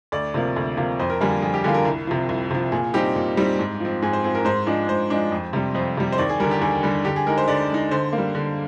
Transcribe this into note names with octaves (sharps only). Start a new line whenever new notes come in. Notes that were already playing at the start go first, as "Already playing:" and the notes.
D2 D5
C3 F3 A#3
D2
C3 F3 A#3
F2 C5
A#4
D3 G3 A#3 F4 G#4
G#4
F2 G#4
G4
D3 G3 A#3 F4 G#4
A#4
C2
C3 F3
C2
C3 F3
A#2 G#4
G3 C4 D#4 G4
A#2
G3 C4 D#4
G#2
F3 C4
G#2 G#4
C5
F3 C4 G#4
A#4
G#2 C5
F3 G#3 D4
G#2 C5
F3 G#3 D4
F2
C3 G3
F2 C5
C3 G3
C5
D#2 D5
G#4
D3 G3 A#4
G4
D#2 G#4
D3 G3
D3 G4
G#4
G#3 D#4 A#4
C5
D3 D5
G#3 D#4
D3 C5
A#3
G3
D3